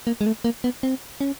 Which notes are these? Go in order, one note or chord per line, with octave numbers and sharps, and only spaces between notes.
A#3
G#3
A3
A#3
B3
C4
C#4